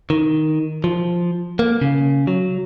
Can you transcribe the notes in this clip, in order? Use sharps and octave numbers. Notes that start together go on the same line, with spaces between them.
D#3
F3
A#3
C#3
F#3